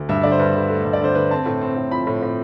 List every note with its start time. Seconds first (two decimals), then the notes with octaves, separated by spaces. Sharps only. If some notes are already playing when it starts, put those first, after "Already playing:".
Already playing: D2
0.09 G2 E5
0.23 D3 D5
0.32 C5
0.39 G2 B4
0.54 D3
0.70 A3
0.85 G2
0.93 D5
1.01 D3 C5
1.15 D3 B4
1.31 C4 A5
1.46 A2
1.61 C4
1.76 A2
1.91 F3 B5
2.07 A2
2.22 A2